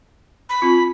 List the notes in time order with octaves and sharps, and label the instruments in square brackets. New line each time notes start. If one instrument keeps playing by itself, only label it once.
[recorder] B5
[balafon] C4 F4